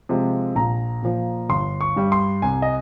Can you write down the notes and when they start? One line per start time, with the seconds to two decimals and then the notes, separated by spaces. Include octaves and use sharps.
0.09 C3 F3 G#3
0.55 A#1 A#5
1.03 A#2 F3
1.49 G1 C6
1.81 C#6
1.96 G2 G3
2.12 C6
2.42 C2 G#5
2.62 D#5